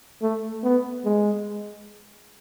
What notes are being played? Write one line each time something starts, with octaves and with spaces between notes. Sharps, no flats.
A3
B3
G#3